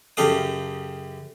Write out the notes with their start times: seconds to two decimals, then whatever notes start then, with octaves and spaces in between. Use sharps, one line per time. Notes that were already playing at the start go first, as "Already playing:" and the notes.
0.17 F#2 C#3 G4 A4 F5 D#6